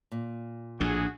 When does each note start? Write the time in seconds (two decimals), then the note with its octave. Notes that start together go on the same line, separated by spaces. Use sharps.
0.12 A#2
0.80 A#1 A2 D4 F#4 G#4